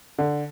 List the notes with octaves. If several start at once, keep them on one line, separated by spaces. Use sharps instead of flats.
D3